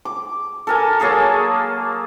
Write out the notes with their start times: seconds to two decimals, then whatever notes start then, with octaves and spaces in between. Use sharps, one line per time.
0.05 D6
0.67 A4 A#4 G#5
1.00 F#3 A#3 G#4 A4